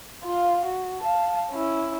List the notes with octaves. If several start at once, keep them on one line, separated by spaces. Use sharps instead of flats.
F4 F5
F#4
F5 A5
C#4 E4